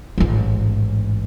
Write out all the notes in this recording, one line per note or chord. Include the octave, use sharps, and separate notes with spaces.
A1 G#2